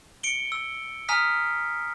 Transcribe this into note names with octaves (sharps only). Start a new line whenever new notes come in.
C#7 D7 G7
E6
G#5 A#5 D#6 F6 B6